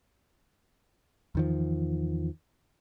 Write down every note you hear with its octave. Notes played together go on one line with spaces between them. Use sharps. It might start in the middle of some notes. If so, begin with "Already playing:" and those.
E2 D#3 F3